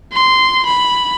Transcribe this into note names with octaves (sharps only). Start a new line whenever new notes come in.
C6
B5